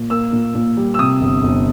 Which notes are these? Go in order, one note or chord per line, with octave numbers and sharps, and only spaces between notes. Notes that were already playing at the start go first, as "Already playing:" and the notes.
Already playing: A#2
A#3 E6
A#2
A#2
G3
E6
C3 D#6
G1
G1